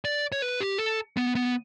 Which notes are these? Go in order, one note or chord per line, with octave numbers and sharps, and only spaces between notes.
D5
C#5
B4
G4
A4
B3
B3